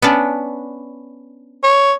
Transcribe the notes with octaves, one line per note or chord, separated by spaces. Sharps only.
B3 C#4 D4
C#5